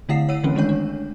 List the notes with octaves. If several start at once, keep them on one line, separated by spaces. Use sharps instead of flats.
D3 A3 E4 F5 F#5 C7
C#5 F#5 E6 D#7
D3 E3 A3 C4 C#4
D#3 G#3 A3 D4 C#5 G6
D4